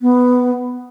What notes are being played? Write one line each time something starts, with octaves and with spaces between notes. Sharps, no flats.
B3